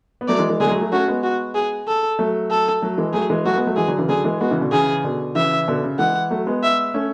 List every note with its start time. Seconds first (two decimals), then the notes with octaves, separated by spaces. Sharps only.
0.21 B3
0.28 F#3 A3 D5
0.39 E3 G#3
0.49 E3 G#3
0.60 D3 F#3 G#4
0.66 G#3
0.70 F#3 A3
0.81 F#3 A3
0.92 A3 C#4 F#4
1.08 G#3 B3
1.23 F#4
1.55 G#4
1.88 A4
2.19 F#3 A3
2.50 A4
2.82 F#3 A3
2.98 E3 G#3
3.13 F#3 A3 G#4
3.30 E3 G#3
3.45 F#3 A3 F#4
3.56 G#3 B3
3.67 F#3 A3
3.77 E3 G#3 G#4
3.88 D3 F#3
3.98 C#3 E3
4.09 D3 F#3 G#4
4.24 E3 G#3
4.41 G#3 B3 F#4
4.51 C#3 E3
4.61 B2 D3
4.72 C#3 E3 G#4
5.04 B2 D3
5.35 C#3 E3 E5
5.68 B2 D3
5.83 C#3
5.99 E3 G#3 F#5
6.31 F#3 A3
6.47 G#3 B3
6.63 E5
6.94 A3 C#4